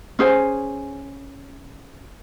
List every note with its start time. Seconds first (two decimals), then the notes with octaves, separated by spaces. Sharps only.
0.19 C#4 G#4 C5 G#5